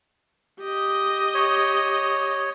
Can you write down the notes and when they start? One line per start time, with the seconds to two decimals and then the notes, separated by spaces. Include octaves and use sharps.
0.61 G4 D#5
1.34 C#5